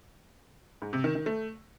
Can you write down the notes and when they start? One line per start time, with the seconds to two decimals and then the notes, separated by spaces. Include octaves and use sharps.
0.82 G#2
0.93 C3
1.04 D#3
1.15 D#3
1.26 A3